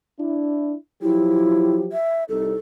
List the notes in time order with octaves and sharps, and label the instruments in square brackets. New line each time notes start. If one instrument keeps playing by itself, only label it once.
[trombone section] D4 E4
[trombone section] F3 F#3 G4 [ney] E4
[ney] E5
[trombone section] C2 D#4 [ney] A4